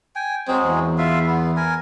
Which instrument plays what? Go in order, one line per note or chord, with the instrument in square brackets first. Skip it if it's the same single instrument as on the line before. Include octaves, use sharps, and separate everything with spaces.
[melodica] G5 G#5
[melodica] F#3 G#3 G#4 [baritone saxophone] C4
[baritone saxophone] E2
[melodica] F4 E5 F5
B3
A#4 G#5